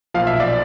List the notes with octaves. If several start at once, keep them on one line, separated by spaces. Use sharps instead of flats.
B1 A#2 F3 F5
E5
D5